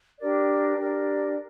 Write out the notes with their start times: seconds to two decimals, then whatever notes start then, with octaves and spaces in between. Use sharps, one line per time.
0.17 D4 G4 A#4 D5
0.76 D4 G4 A#4 D5